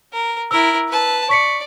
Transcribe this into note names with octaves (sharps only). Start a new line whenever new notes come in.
A#4
E4 A#4 E6
B4 A5
D5 C#6 B6 C#7